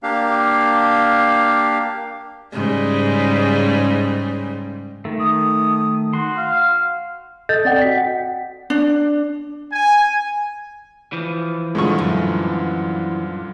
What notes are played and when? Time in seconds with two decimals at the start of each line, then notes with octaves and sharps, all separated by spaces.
0.03 A#3 D4 G4 F5
2.52 G#2 C#3 G3
5.05 D#3 A3
5.20 D#6
6.13 F#4 C6
6.37 F5
7.49 A4 D#5 G6 A6
7.65 C4 D5 D#5 F#5 G5
7.82 F#4 B6
7.98 F#5
8.70 D4
9.72 G#5
11.13 E3 F3
11.75 G2 A#2 D3 G#3 C#6
11.99 F#2